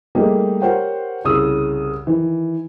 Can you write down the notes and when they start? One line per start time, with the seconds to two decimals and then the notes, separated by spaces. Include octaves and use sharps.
0.15 G3 A3 A#3 D#4 G4 G#4
0.62 G4 A#4 C5 C#5 F#5 G5
1.25 C2 C#3 D#6 E6
2.07 D#3 E3